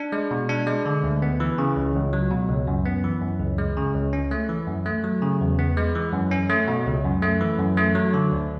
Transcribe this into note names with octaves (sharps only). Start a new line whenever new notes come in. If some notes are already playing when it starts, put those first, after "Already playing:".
Already playing: D4
G#3
B2
D4
G#3
D3
D2
B3
E3
C#3
C#2
C#2
F#3
B2
C#2
F#2
B3
E3
F#2
C#2
G#3
C#3
C#2
C#4
A3
E3
F#2
A3
F#3
C#3
E2
B3
G#3
E3
F#2
C#4
A3
B2
C#2
F#2
A3
E3
F#2
A3
F#3
D3
D2